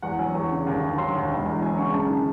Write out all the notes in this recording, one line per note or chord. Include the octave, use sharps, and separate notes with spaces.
E2 F#5
F#3 G#5
E2 C#6
C#3
D#2
D#2
F#3 C6
D#2
E1
E2
F#3 G#5
C#3 C#6
F#2 A5
D#3